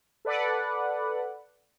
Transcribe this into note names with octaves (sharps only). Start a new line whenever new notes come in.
A4 B4 D5 F#5